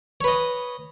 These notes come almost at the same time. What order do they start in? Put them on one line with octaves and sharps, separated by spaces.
C#5 B4 D#5